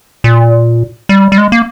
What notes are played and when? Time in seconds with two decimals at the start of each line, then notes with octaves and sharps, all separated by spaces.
0.24 A#2
1.09 G3
1.32 G3
1.38 G#3
1.52 A#3